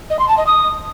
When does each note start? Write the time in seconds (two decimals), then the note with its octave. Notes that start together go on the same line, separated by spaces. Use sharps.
0.10 D#5
0.19 C6
0.28 A5
0.37 D#5
0.46 D#6